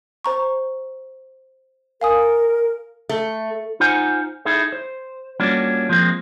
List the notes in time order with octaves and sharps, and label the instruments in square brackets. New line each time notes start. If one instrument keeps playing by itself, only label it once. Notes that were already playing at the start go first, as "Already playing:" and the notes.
[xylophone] C5 A#5 C#6
[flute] A#4 [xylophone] F5 G#5 D#6
[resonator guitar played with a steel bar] A3
[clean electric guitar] D#4 F4 C5 F#5 G#5
D#4 E4 G#4 A4
C5
G3 A#3 C#4 D4 F4 F#4
F3 G#3 A#3 C4